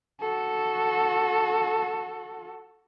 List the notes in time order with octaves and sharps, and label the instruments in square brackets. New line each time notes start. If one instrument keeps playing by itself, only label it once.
[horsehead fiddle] F#4 A4